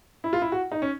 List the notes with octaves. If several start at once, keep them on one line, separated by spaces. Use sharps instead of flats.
E4
F4
E4
F#4
D#4
C#4